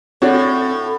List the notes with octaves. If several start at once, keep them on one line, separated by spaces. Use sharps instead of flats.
A2 C4 D4 F#4 A4 C#5